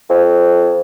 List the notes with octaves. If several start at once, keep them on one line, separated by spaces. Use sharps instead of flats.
F2